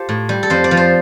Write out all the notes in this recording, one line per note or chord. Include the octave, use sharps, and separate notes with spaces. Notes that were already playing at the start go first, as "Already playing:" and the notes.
Already playing: F4 G4 A4 C5
A2
G3
A4
F2 C5
D5
F3
C5